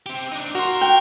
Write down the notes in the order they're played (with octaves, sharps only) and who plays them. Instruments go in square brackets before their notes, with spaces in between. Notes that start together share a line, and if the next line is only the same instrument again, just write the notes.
[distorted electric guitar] C4 G4
D4 D#4
[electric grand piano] F#4 C6 [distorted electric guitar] A#4
[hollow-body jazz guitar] G5